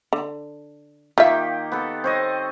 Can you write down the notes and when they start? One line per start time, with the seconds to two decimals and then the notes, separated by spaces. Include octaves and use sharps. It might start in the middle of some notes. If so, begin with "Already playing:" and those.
0.13 D3
1.18 D#3 A#3 F4 G4 E5
1.72 B3 A4
2.04 C4 C#5 D#5